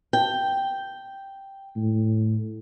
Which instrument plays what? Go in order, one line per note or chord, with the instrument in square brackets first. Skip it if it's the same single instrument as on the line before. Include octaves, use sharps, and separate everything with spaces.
[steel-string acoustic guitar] G5
[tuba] A2